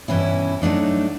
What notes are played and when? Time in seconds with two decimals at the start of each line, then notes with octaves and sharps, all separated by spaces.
0.08 G2 B2 E3 C#4 E4
0.62 F#3 A3 D4 D#4